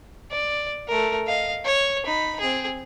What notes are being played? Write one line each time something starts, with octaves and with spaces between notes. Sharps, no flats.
D5
A3 A#4
D#5 F5
C#5
D#4 B5
C4 G#4